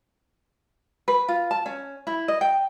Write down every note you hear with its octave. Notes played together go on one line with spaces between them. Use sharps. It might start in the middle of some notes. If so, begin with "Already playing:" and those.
B4
F4
A5
C#4
E4
D#5
G5